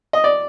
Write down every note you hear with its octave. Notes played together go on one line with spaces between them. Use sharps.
D#5
D5